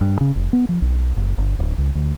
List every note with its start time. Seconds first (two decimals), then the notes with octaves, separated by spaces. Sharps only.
0.01 G2
0.21 C#3
0.36 F1
0.53 B3
0.69 F3
0.82 B1
1.17 F#1
1.38 G1
1.59 D1
1.78 C#2
1.95 D2